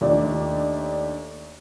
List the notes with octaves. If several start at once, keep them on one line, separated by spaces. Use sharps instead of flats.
D#2 A3 D4 D5